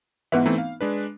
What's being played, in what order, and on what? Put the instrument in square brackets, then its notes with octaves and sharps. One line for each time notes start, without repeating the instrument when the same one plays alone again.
[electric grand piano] G#2 E3 [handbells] B3 B4 E5
[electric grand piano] E3 A3 C4 [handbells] D#4
[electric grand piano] F5
G#3 D4 B4